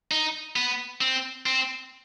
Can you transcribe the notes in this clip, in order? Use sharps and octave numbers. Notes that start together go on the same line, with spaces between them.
D#4
B3
C4
C4